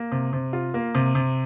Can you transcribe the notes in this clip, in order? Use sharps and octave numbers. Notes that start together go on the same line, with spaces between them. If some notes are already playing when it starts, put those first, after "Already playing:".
Already playing: A#3
C3
C3
F4
A#3
C3
C3